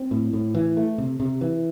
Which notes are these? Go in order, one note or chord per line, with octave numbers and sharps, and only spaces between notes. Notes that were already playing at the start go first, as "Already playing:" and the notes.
Already playing: C4
A2
A2
E3
A3
C3
C3
E3